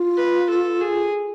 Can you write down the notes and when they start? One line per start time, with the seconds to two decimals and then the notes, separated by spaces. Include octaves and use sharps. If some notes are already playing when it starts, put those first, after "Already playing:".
Already playing: F4
0.17 B4
0.50 A4
0.81 G#4